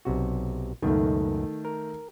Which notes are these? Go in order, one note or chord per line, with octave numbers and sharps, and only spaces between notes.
B1 C3 F#4
C#2 F#2 B2 D#3 A3
A#4